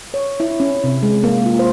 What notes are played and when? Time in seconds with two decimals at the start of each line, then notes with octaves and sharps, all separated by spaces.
0.14 C#5
0.40 E4
0.60 C#4
0.84 C3
1.02 G#3
1.24 A#3
1.46 F4
1.59 C5